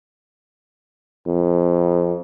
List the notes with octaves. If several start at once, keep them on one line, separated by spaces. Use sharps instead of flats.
F2